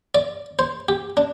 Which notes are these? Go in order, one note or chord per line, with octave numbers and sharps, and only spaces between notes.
D5
C5
G4
D4